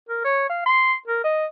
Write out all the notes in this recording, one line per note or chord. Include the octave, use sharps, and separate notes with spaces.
A#4
C#5
F5
C6
A#4
D#5